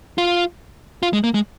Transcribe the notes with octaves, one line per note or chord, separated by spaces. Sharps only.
F4
F4
G#3
A#3
G#3